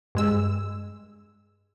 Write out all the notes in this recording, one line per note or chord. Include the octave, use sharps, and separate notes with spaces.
G2 G#3 E6